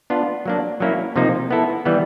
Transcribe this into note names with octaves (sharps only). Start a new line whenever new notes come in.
B3 D4 F4
F#3 A#3 D4
F#3 A#3 C#4 E4
C3 F3 A#3 D#4
B3 E4 A4
E3 G3 B3